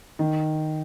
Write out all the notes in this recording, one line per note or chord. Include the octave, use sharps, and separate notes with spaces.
D#3